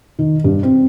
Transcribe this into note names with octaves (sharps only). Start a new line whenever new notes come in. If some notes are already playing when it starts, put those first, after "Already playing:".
D#3
G2
C4